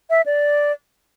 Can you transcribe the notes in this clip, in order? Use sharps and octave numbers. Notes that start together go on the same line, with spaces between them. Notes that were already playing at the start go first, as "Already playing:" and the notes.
E5
D5